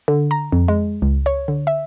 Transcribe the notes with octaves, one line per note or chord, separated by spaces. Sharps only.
D3
A#5
F2
G#3
C#2
C#5
D3
E5